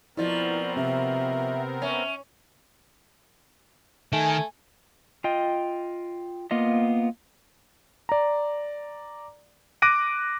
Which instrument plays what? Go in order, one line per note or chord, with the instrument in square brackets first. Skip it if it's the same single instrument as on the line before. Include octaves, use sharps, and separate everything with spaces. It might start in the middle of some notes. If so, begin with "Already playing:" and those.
[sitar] B2 F3 [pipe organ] B3 C4 A#4 [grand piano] E4 [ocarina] D5
[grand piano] C3 [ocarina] E5
[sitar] C#4 [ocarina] E5
[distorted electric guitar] D#3 [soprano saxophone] A3 [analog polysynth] G#5
[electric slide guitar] F4 D#5 G5
A#3 B3 F4 D#5
[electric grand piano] D5 A#5
D6 F#6 A#6 D7 D#7